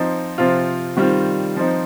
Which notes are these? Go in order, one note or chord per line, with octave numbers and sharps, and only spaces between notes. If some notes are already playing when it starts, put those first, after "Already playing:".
Already playing: F3 C4 D#4
C3 F3 C4 F4
D#3 G3 C4 F4
F3 C4 D#4